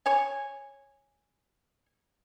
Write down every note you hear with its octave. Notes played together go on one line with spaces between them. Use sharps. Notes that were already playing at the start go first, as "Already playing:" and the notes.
C#5 G#5